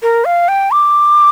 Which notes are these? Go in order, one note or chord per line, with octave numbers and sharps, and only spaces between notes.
A#4
F5
G5
D6